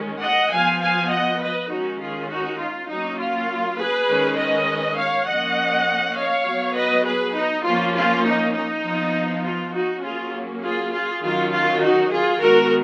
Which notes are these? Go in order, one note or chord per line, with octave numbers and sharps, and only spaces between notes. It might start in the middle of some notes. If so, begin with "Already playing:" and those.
Already playing: D#3 G#3 C#4
D#5 F#5
F3 B3 F5 G#5
F5 G#5
D#5 F#5
B4 D#5
D#3 G#3 C#4 D#4 F#4
F4 G#4
D#4 F#4
F4
F#3 A#3 C#4 D#4
F4
G#4 B4
D#3 G#3 C#4
B4 D#5
C#5 F5
F3 A#3 C#4 D#5 F#5
C#5 F5
F#3 B3
B4 D#5
G#4 B4
D#4
F3 A#3 C#4 F4
F4
D#4
D#4
F3 B3
F4
D#4 F#4
F#3 A#3 C#4 F4 G#4
F4 G#4
F4 G#4
D#3 F#3 C#4 F4
F4
D#4 F#4
F4 G#4
D#3 G#3 B3 F#4 A#4